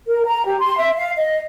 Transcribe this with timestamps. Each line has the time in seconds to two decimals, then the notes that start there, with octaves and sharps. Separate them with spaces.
0.08 A#4
0.25 A#5
0.46 G4
0.60 C6
0.78 E5
0.96 F5
1.18 D#5